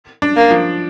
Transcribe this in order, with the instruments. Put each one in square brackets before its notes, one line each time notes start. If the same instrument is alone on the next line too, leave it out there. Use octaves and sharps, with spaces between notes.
[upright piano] D4
[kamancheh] A#3
[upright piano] F3